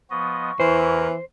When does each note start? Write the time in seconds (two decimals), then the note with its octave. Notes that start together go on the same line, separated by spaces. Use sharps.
0.10 F3 B3 D#5 C#6
0.60 E2 E3 E4 A#4 C5